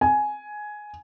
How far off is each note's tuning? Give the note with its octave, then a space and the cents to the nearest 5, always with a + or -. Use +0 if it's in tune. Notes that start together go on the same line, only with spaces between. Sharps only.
G#5 +10